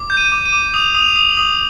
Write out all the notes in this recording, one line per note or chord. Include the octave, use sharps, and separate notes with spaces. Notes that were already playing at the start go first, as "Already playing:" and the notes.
Already playing: D6
G6
D#7
D6
D#7
D6
D#6 F7
D#6
F7
D#6
F#7
D#6